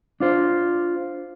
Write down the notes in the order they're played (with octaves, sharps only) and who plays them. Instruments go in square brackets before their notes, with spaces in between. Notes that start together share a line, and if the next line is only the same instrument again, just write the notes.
[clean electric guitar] D4 F4 C5